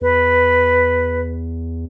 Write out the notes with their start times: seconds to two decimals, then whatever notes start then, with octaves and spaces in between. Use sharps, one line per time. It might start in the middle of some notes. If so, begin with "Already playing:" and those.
0.01 E2 B4